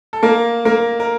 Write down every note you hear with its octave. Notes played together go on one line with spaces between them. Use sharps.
A4
A#3 A#4
A#3 A#4
A#4